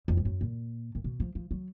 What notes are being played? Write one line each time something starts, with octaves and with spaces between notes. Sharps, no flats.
F2
G#2
F#2
A#2
A#2
B2
F3
F3
F#3